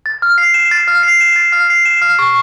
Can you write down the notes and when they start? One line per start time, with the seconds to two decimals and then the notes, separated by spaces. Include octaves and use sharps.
0.06 A6
0.22 F6
0.38 C7
0.54 E7
0.71 A6
0.88 F6
1.03 C7
1.21 E7
1.36 A6
1.52 F6
1.70 C7
1.86 E7
2.02 F6
2.19 C#6